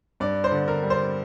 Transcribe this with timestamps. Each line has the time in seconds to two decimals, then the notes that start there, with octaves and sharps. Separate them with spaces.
0.20 G2 D5
0.44 C5
0.51 D3
0.68 A#4
0.83 G3
0.90 C5